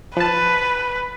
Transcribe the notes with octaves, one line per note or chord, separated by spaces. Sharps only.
F3 B4 A5